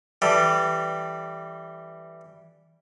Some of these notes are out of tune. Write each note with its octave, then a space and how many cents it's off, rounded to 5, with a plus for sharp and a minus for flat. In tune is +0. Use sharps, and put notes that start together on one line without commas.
E3 +0 G3 +0 A4 +0